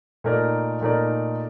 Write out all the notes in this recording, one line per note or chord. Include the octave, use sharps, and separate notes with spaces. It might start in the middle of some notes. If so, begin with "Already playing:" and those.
A#2 A3 D#4 A#4 D5
A#2 A3 D#4 A#4 D5